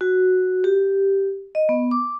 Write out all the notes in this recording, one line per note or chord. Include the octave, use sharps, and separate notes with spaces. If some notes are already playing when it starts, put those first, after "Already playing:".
F#4
G4
D#5
B3
D6